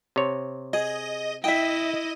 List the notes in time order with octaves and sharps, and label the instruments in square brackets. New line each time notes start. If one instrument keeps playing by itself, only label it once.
[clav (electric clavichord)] C3 C#5
[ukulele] G#4 [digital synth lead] D#5
[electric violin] E4 [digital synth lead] D#5 [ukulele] E5 G5